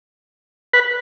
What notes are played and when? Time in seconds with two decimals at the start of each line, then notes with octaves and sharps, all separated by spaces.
0.73 B4